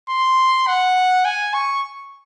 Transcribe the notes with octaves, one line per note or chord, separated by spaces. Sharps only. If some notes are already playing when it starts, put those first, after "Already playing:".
C6
F#5
G#5
C#6